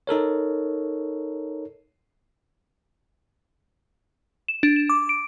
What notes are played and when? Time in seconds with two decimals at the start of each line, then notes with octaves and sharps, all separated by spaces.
0.07 D#4 A4 A#4 C#5
4.48 E7
4.63 D4
4.76 E7
4.90 D6
5.09 D7